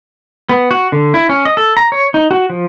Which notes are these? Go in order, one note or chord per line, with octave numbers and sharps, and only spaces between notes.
B3
F#4
D3
E4
C#4
D#5
A4
A#5
C#5
D#4
F#4
F3